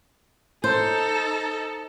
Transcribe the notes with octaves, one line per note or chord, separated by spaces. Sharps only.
D#4 A4 C5